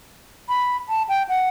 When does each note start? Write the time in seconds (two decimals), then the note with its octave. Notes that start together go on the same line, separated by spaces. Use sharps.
0.49 B5
0.89 A5
1.09 G5
1.29 F#5